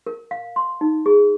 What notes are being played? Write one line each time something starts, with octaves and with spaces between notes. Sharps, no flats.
A#4
F5
C6
D#4
G#4